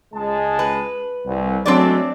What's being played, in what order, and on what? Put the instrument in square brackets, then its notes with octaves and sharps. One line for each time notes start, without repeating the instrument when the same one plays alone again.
[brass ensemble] C#2 G#3 A5
[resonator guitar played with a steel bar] B4
[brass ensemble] C2
[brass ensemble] F#3 G#3 A3 [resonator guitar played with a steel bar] C4 D4 D5